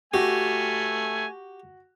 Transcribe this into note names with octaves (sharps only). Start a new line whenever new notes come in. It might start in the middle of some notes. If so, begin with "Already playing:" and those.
A3 F#4 G4 G#5